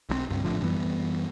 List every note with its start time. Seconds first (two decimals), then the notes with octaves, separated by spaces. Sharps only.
0.09 B1 F#3 C4
0.30 C#2 G2
0.44 A#1 A2 D3 F3
0.62 F#2 E3 G3 B3